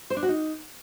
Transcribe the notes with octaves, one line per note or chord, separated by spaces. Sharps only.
C5
D4
F#4
D#4